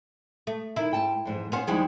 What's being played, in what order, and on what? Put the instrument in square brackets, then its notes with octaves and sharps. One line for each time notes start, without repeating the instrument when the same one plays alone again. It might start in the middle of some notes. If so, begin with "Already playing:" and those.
[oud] A3
[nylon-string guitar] D#3 [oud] E4
[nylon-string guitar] G#2 G5 A5
F2 G#2 E3
[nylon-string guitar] B3 F5 F#5 [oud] C#4 C5
[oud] D#2 G3 G#3 [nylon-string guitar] F3 E4